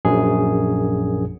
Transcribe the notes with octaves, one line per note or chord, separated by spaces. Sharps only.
A#1 F#2 G#4